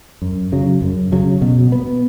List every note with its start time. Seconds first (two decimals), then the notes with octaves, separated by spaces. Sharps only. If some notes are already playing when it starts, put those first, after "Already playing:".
0.22 F#2
0.52 C#3 F#3
0.82 F#2
1.12 C#3 F#3
1.42 B2
1.72 B3